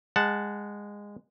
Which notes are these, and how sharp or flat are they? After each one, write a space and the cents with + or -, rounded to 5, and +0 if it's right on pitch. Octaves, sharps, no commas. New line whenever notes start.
G#3 -15 F#5 +0 A5 +0